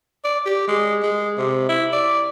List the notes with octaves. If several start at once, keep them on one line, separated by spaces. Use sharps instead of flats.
D5
G4
G#3
G#3
C3
E4
D5